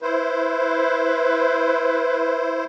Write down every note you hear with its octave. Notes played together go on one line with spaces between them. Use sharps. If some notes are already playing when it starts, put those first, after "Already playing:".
E4 B4 C5